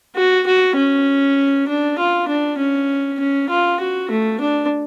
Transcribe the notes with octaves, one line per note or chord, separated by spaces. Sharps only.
F#4
F#4
C#4
D4
F4
D4
C#4
C#4
F4
F#4
A3
D4